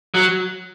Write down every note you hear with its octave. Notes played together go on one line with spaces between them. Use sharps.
F#3